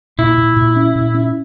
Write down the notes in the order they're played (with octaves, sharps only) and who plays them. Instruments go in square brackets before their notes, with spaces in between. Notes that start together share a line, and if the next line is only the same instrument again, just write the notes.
[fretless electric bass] A#2 [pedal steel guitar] E4
[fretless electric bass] A#2
A#2
C#4
A#2
C#4